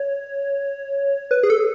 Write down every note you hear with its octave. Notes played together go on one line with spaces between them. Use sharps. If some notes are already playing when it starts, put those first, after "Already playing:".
Already playing: C#5
B4
G#4
A4